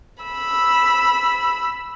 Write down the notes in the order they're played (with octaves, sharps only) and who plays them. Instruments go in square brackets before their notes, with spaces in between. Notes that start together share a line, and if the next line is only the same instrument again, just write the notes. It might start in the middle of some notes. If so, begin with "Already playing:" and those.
[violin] B5 E6